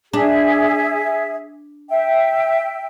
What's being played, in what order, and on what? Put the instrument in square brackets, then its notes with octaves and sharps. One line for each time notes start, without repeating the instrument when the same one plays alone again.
[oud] D4 [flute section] G#4 E5
[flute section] E5 G5